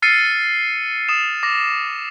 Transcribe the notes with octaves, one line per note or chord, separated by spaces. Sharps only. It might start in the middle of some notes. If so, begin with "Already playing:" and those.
E6 F6 A6 C7 C#7 D#7
D#6 E7
D6 A#6